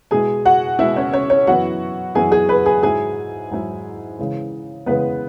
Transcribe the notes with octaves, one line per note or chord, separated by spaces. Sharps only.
B2 G#3 E4 G#4 G#5
F#4 F#5
B2 G#3 E4 E5
C#4 C#5
C#4 C#5
C#4 C#5
F#2 E3 B3 E4 F#4 F#5
F#2 E3 B3 E4 G#4 G#5
G#4 G#5
B4 B5
G#4 G#5
G#2 F#3 E4 G#4 G#5
G#2 F#3 E4
C#3 E3 G#3
C#3 E3 G#3 B3 B4